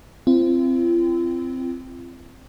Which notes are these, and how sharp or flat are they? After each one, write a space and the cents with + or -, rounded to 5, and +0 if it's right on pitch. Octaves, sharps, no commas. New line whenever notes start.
C4 +0 F4 -40